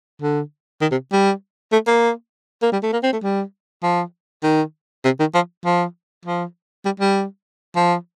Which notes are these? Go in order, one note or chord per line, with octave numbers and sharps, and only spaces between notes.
D3
D#3
C3
G3
A3
A#3
A#3
G3
A3
A#3
C4
A3
G3
F3
D#3
C3
D#3
F3
F3
F3
G3
G3
F3